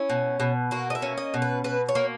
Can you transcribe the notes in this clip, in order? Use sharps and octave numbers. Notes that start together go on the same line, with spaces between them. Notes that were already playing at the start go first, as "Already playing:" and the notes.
Already playing: C#4 E4
B2
B2
A#3 F#4
D#5
E5
C#4
D#5
B2
B4
B2 B4
C#5
A#3